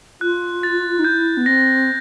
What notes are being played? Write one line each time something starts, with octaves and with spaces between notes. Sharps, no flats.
F4 F#6
A6
D#4
E4 G6
B3
C4 A#6